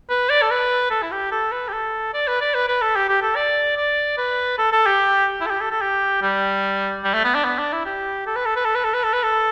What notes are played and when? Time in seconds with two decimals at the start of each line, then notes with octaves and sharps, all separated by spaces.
0.10 B4
0.30 D5
0.42 A4
0.51 B4
0.91 A4
1.02 E4
1.12 G4
1.32 A4
1.52 B4
1.68 G4
1.73 A4
2.14 D5
2.27 B4
2.41 D5
2.54 B4
2.68 B4
2.82 A4
2.96 G4
3.09 G4
3.22 A4
3.36 D5
3.77 D5
4.18 B4
4.58 A4
4.72 A4
4.86 G4
5.41 E4
5.46 A4
5.50 G4
5.61 A4
5.71 A4
5.81 G4
6.22 G3
7.04 G3
7.14 A3
7.24 B3
7.35 D4
7.45 B3
7.59 D4
7.73 E4
7.85 G4
8.27 A4
8.36 B4
8.45 A4
8.56 B4
8.65 A4
8.75 B4
8.84 A4
8.94 B4
9.03 A4
9.13 B4
9.23 A4